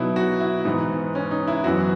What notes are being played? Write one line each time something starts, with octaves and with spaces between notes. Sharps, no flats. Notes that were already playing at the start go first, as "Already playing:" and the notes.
Already playing: B2 F#3 B3 D#4 E4
F#4
E4
G#2 E3 B3 D#4
C#4
D#4
E4
F#2 E3 B3 F#4